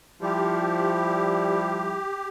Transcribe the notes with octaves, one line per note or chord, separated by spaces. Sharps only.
F3 G3 E4 G4